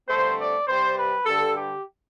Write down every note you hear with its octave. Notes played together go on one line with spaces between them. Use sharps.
G2 D3 A3 C4 C5
D5
C3 G3 C4 C5
B4
G2 D3 G3 A4
G4